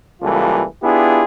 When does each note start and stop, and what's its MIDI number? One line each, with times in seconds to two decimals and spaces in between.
0.22 0.64 37
0.22 0.64 52
0.22 0.64 55
0.22 0.64 58
0.22 0.64 65
0.22 0.64 69
0.83 1.24 59
0.83 1.24 62
0.83 1.24 64
0.83 1.24 65
0.83 1.24 67
0.83 1.24 68